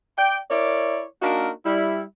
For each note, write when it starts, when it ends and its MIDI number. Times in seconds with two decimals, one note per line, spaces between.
0.18 0.38 74
0.18 0.38 79
0.51 1.03 64
0.51 1.03 70
0.51 1.03 73
0.51 1.03 74
1.22 1.51 58
1.22 1.51 62
1.22 1.51 63
1.22 1.51 66
1.22 1.51 70
1.66 2.02 55
1.66 2.02 64